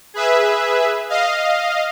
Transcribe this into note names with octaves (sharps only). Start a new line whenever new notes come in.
G#4 B4 E5
D#5 F5